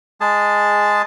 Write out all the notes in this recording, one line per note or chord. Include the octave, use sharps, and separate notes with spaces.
G#3 G#4 A5